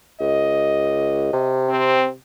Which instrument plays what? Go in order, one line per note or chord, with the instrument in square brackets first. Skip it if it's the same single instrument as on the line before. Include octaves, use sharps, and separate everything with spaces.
[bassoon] C#2 [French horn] D#5
[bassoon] C3
[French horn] C4